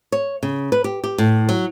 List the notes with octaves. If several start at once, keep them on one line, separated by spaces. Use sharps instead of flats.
C#5
C#3
B4
G4
G4
A2
F#3